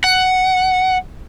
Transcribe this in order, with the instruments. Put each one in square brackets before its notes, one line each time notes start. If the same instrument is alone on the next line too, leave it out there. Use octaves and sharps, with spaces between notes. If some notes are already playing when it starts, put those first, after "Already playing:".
[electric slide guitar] F#5